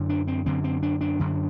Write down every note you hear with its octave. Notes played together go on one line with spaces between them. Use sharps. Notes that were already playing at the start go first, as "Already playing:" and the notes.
Already playing: F#2 D3
D4
C4
F#2 D3 C4
C4
D4
D4
F#2 D3